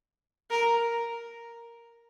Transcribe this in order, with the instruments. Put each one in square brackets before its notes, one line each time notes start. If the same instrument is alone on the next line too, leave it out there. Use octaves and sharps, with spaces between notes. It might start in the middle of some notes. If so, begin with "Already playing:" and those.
[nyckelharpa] A#4